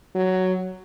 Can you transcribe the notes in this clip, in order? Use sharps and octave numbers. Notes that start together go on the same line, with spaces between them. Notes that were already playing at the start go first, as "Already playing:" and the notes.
F#3